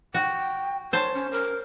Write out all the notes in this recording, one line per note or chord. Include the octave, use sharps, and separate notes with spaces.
F#4 G5
C5 C#5 A5
C#4
A#4